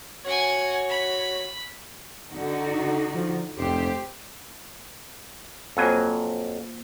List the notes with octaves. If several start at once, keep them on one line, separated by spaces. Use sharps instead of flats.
F#4 C#5 F#5 G#5
B5
D3 D#4 F#4
F3
F1 G4 C5
F2 F#3 A#3 F4 C5 G#5